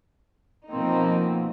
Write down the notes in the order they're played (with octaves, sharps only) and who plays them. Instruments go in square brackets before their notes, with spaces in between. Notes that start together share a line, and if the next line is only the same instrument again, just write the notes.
[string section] B2 F3 A#3 C4 D#4